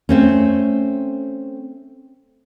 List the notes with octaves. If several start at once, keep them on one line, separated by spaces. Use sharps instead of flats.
A3 C4 C#4